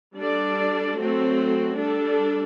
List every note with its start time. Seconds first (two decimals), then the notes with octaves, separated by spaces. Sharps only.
0.17 G3 D4 A4 D5
0.97 F#3 A3 C4 F#4
1.76 G3 D4 A4